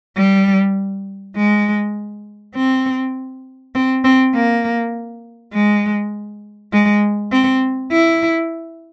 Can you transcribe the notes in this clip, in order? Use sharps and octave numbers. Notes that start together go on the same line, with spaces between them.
G3
G#3
C4
C4
C4
A#3
G#3
G#3
C4
E4